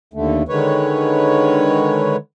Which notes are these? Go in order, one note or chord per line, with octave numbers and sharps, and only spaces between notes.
D#2 D3 A3
D3 D#3 G#3 B4 C#5